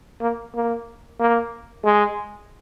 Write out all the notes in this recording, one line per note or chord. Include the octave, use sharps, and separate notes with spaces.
A#3
A#3
A#3
G#3